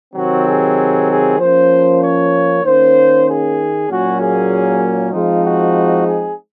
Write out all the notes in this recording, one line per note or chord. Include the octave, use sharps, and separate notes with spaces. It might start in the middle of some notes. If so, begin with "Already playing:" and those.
C3 D#3 F#3 C4 F#4
G#4
G#4
F3 A#3 C#4 C5
C#5
D#3 A#3 C#4 C5
G#4
A#2 F#3 A#3 C#4 F#4
G#4
F3 G#3 C4 D#4 F4
F#4
G#4